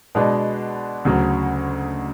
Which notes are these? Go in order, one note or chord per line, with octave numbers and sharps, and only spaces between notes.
B2 G#3 B3 D4
D2 C#3 F#3